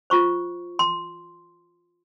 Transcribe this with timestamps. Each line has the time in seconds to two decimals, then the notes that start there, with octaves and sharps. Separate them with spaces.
0.10 F4 C5 C#6
0.79 C6